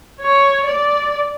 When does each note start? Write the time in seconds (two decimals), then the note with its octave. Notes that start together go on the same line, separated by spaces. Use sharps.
0.22 C#5
0.68 D5